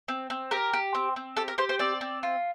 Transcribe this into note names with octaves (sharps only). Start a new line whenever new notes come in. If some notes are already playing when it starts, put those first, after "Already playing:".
C4
C4
G4 A#4
G4
C4
C4
G4 A4
A#4
G4 C5
C5
C4 D5
C4
F4